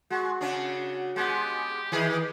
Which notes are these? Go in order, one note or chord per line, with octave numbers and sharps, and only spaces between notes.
G#3 F#4
C#3 C#4 D4
G#3 B3 G4
D#3 E3 G#4 D#5